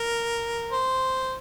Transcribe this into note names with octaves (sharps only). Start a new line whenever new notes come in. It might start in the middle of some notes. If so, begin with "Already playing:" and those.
Already playing: A#4
C5